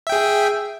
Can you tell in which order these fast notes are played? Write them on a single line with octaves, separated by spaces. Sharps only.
E5 G5 G#4